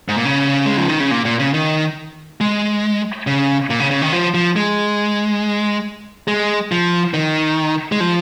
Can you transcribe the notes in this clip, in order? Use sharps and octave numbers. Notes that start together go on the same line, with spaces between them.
G#2
A#2
C#3
G#3
F3
D#3
C#3
A#2
A#2
C#3
D#3
G#3
C#3
A#2
C#3
C#3
D#3
F3
F3
G#3
G#3
F3
D#3
G#3
F3